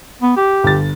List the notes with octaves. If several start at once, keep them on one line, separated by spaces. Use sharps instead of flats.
B3
G4
G1 A6